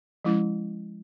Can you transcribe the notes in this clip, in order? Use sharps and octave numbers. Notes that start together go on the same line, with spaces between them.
F3 G#3 C#4 E4